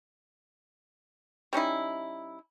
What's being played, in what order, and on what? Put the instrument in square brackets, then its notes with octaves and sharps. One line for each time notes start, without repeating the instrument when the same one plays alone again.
[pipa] G3 C#4 D#4 E4